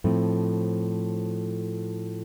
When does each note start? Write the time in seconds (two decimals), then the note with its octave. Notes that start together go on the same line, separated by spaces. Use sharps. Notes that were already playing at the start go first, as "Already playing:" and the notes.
0.04 A2 F3 A3 C4